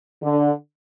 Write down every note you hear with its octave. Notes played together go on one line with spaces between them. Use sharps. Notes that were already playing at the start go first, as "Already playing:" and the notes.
D3